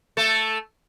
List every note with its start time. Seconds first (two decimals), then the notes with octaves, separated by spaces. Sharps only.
0.17 A3 A4